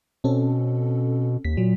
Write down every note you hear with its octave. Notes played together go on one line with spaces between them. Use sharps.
B2 C4 C#4 A4
D#2 B6
A#2 F#3